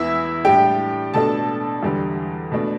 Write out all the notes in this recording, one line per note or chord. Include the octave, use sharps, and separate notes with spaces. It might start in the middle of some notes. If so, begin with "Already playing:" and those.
Already playing: E2 E3 B3 E4 E5
A2 G3 D4 G4 G5
B2 A3 D4 A4 A5
E2 D3 G3
B2 A3 D4